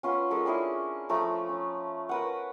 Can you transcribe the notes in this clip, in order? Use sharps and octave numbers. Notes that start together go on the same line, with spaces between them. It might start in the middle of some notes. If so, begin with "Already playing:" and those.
C#4 F4 B4 F#5
G#3 C#4 A4 A#4
C#4 D4 E4 G#4
F3 A3 A#5 B5
C#4
A#4 B4 F#5